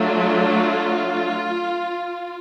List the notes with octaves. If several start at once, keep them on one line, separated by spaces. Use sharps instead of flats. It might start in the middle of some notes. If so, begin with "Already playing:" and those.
Already playing: F#3 A3 D4 F4